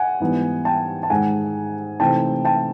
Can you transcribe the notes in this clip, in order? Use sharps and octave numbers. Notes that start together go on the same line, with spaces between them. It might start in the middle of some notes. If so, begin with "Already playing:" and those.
Already playing: F#5 G#5
G#2 E3 G3 B3
G5 A5
A5
G#2 D#3 G#3 F#5 G#5
C3 E3 A3 C4 D#4 G5 A5
G5 A5